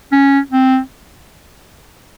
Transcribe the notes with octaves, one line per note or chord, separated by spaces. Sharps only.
C#4
C4